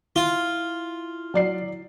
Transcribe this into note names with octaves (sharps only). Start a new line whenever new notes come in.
E4 F4
F#3 D5 C7